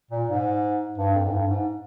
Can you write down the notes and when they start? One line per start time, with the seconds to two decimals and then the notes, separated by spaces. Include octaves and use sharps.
0.11 A#2
0.29 G#2
0.98 G2
1.15 F2
1.25 G#2
1.32 G2
1.49 G#2